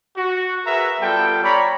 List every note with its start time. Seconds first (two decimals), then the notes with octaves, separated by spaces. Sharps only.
0.17 F#4
0.66 G#4 A#4 B4 E5 F#5 A#5
1.01 G3 B3 F4 A4 G5
1.44 C#5 D5 A#5 B5